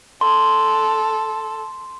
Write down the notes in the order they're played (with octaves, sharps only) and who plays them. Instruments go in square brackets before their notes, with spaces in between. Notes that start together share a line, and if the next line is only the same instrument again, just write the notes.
[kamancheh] A4 [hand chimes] C6